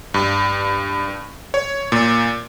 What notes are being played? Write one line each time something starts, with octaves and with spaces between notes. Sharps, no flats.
G2
C#5
A#2